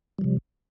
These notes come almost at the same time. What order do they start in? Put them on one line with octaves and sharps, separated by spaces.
G3 F3 C3